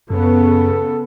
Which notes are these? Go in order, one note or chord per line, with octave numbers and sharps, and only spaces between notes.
F#2 C#3 B3 A4